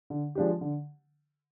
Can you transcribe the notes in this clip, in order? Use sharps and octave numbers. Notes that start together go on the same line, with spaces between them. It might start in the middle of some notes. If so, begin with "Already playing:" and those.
D3
F3 G#3 D4 G4
D3